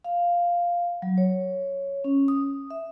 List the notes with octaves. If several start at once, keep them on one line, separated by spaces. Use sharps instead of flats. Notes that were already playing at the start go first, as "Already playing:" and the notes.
F5
F#3
C#5
C#4
D#6
E5